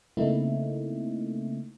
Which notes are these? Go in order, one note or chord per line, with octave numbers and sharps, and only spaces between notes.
C#3 A3 A#3 C4 D#4 E4